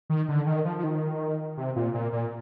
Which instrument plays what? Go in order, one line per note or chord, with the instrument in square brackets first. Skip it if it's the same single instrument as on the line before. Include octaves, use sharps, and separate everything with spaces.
[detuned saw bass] D#3
D3
D#3
F3
F3
D#3
C3
A#2
A#2
A#2